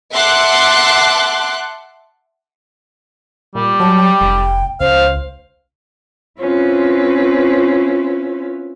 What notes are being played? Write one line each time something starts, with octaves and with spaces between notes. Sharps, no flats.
E5 F#5 A5 C6 D6 F#6
A#2 G3
F#3 A5
G5
F1
C#2 C5 F5
C4 C#4 E4 F4 B4 C5